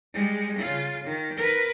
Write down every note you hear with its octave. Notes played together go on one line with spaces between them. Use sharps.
G3 G#3
C#3 F4
D#3
A#4 B4